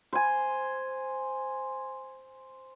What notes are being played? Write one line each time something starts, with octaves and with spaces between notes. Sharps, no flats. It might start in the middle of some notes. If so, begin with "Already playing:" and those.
C5 G#5